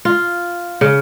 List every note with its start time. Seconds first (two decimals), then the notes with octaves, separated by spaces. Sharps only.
0.05 F4
0.81 C#3